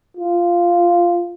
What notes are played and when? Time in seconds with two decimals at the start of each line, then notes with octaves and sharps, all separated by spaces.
0.17 F4